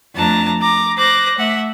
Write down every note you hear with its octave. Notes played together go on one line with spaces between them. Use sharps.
F2 A3 D4 A5 A#5
A#5 D6
C5 D6 F#6 A#6
A3 E5 F#5